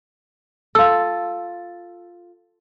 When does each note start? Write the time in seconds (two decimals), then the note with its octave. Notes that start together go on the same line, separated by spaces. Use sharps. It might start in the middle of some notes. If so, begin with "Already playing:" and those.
0.75 F4 A4 E6